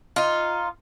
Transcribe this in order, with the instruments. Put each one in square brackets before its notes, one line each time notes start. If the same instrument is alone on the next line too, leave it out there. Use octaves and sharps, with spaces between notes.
[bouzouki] D#4 F4